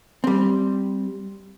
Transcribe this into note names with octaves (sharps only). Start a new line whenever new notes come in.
G3 C4